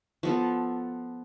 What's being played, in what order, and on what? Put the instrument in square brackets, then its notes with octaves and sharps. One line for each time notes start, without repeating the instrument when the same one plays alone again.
[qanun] F3 B3 A4